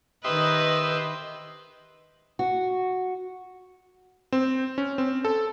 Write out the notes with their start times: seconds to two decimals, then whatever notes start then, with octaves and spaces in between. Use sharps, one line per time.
0.24 D#3 G4 B4 C5 D#5 E5 D#6
2.39 F#4
4.32 C4
4.78 C#4
4.98 C4
5.25 A4